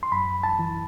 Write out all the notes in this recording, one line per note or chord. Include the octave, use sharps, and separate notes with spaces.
C6
F#2 B5
A5
E3